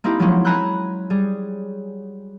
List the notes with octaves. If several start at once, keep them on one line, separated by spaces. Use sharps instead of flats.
A#3 C4 D#4 E4 G4
F3 F#3 G#3 A#3 C4 C#4
G#5 A#5 B5 E6 F#6 G6
G3 G#4